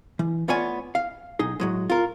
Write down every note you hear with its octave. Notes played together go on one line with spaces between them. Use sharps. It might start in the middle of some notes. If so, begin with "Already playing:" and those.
E3
A3 B3 F4 C#5 D5 G#5
F5
B1 D#4 G#4
A2 F#3 G#3
F4 A#4